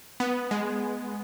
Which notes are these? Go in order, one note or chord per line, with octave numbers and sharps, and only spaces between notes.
B3
G#3